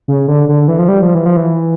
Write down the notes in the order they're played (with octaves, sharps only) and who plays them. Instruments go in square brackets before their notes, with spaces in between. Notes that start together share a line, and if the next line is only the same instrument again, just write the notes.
[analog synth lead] C#3
D3
D3
E3
F3
G3
F3
E3
F3
E3